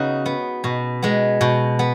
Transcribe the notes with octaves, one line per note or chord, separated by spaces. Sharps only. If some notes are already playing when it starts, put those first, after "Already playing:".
Already playing: C#3 B3 C#4 D#4 F#4
B3
B2
G#3 B3
B2
B3